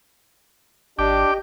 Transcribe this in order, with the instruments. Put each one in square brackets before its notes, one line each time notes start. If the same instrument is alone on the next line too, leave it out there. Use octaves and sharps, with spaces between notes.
[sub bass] G#1 [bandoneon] D4 [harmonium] G4 D#5 [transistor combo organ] G5 D6